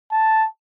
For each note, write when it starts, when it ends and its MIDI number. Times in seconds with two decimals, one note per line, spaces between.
0.12 0.47 81